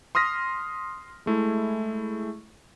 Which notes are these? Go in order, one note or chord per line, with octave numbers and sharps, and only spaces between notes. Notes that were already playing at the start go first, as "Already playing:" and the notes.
C6 D#6 F6 A#6 B6
G#3 A3 E4 G#4